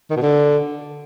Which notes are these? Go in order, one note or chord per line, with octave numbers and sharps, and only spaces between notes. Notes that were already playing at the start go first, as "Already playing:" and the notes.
D#3
B2
D3